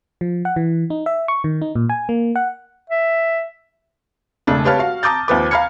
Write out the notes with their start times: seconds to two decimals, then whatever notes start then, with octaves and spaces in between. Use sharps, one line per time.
0.21 F3
0.45 F#5
0.56 E3
0.90 D#4
1.06 E5
1.28 C#6
1.44 D#3
1.62 D#4
1.75 A#2
1.89 G#5
2.09 A#3
2.36 F#5
2.90 E5
4.47 E1 C#3 A3 D4
4.65 G4 B4 C#5 F5 A5 F6
4.79 F#4 F5
5.03 A5 A#5 D6 D#6 G6 A6
5.28 D#2 F3 B4 D6
5.51 F5 A#5 B5 F6 G#6 C#7